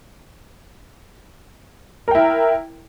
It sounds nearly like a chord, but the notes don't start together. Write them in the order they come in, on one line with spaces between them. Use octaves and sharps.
A#4 G5 E4